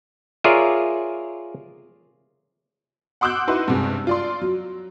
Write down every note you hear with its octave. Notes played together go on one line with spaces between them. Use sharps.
F4 G#4 A#4 C#5 D5 E5
F#5 C6 D6 E6 F#6 G6
D#4 E4 F#4 B4 F#5 C6
G2 C3 G#3
F4 D5 C6
F#3